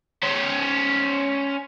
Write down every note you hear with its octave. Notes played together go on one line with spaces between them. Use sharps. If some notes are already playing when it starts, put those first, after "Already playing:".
C#4 C5